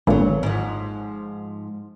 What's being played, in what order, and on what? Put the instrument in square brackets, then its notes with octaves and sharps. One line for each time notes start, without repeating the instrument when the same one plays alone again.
[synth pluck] G#1 A#2 D3 [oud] E2 F#3
[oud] G#2 F3